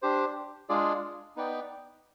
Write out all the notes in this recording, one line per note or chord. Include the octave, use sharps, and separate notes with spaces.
D4 G4 C5
G#3 D4 F4 G#4 D5
B3 D#4 B4 D5 G5